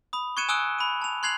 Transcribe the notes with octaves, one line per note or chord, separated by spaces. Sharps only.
B5 D#6
C#6 F#6 G#6 C#7 D#7 E7
G#5 D#6 E6 F#6 D7 G7
B5 D#7
A5 F7
C6 F#6 G#6 C7 F7 F#7